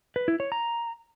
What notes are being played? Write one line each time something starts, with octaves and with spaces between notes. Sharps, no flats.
B4
E4
C#5
A#5